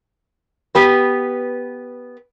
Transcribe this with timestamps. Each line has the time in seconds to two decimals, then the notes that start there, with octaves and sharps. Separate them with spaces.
0.75 B3 G4 B4